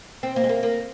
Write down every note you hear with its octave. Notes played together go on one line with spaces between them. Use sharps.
C4
A#3
G#3
A#3
A#3